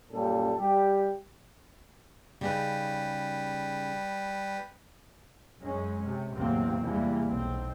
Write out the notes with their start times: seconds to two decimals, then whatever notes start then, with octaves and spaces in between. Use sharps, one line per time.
0.11 F#2 A#2 G3 C#4 A4
0.57 G3 G4
2.41 C#3 G3 D#4 G4 B4
5.60 F#2 G#3 C#4
6.04 C3
6.34 A1 E2 C3 F#3 A#3 C4
6.83 E2 C3 E3 G3 A#3
7.30 B1 C4